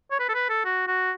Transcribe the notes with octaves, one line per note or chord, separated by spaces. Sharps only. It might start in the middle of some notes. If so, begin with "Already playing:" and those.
C#5
B4
A4
B4
A4
F#4
F#4